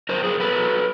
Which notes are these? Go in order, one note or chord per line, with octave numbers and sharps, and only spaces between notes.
F#2 A#4 C5
F#2 G#4 A#4
B2 A4 B4
F#3